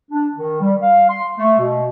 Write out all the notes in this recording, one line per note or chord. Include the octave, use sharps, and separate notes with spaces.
D4
D#3
G3
F5
C6
A3
B2